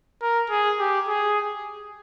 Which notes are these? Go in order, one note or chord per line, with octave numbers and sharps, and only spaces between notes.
A#4
G#4
G4
G#4